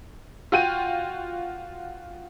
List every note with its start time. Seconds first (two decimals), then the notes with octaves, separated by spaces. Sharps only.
0.52 F4 F#4 G5 D#7